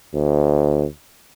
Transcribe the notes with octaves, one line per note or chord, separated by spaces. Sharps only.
D2